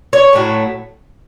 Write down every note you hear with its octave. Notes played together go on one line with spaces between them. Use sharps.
C#5
A2 F#3 A3